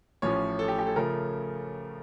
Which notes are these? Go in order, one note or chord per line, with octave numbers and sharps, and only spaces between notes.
A1 A2 F3 C#4 C#5
A4
G4
G4
A4
C#3 F3 A3 A#4